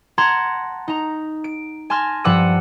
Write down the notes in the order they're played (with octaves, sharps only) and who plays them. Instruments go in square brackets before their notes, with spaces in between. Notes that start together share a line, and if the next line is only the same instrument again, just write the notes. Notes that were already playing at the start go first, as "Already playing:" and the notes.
[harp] F#5 A5 A#5 C6 G#6 A#6
D#4 A#5
D7
G#5 A5 C6 F6 A#6
G2 F3 F#5 D6 E6 D#7